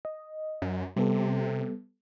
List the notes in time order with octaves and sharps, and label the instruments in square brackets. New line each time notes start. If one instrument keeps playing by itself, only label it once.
[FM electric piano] D#5
[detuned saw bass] F#2
[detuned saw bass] C3 [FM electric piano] G3 B3 A4